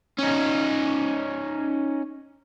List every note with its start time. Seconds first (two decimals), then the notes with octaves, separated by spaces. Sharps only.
0.19 C#4 D#4